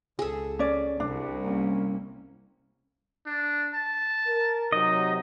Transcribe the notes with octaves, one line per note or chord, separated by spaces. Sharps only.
C#2 G#4 A4
C#4 D5
C2 D4
A#3 C#4
D4
A5
A#4
C3 F#3 D#4 D#5